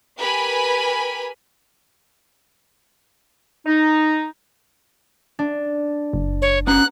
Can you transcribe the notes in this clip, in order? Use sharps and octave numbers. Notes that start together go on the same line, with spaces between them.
G4 A#4 B4 G#5 B5
D#4
D4
F#1
C#5
B3 C#4 A#5 F#6